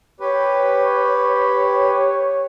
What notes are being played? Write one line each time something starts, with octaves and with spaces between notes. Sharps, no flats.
G4 B4 C#5